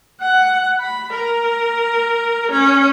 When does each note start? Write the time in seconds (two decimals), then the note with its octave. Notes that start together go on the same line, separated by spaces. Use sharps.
0.21 F#5
0.80 B5
1.14 A#4
2.51 C#4